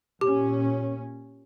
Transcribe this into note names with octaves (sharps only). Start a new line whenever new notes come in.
A#2 C#4 G4